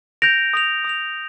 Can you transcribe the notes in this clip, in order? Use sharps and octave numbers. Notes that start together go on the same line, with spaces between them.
G6 A#6 D7 F7
D#6 A#6 F7
D#6 A#6 F7